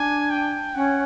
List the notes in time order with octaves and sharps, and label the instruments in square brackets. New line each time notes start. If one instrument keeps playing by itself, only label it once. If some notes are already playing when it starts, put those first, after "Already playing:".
Already playing: [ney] D4 [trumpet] G#5
[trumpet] G5
[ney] C#4 [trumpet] F#5